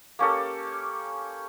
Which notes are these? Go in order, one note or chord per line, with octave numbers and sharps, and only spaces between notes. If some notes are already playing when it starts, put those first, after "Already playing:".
A#3 C#4 G4 A4